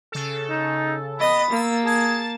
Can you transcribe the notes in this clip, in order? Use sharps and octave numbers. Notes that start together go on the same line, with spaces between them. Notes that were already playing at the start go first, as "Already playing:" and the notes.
C#3 A4
D#4
B3 D#5 B5 D#6 A6
A#3 E6 A6
G#4 A5 A6